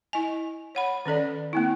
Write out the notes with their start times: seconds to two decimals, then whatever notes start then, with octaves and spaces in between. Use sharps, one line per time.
0.13 E4 D#5 G#5
0.75 C#5 F#5 B5
1.06 D#3 C#4 A4 D5
1.53 A#3 C4 E4